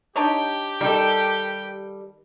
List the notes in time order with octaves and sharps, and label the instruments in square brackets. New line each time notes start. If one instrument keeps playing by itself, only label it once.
[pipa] D4 D#4 C#5 [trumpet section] G4 G5
[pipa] D#3 [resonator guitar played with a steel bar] G3 A4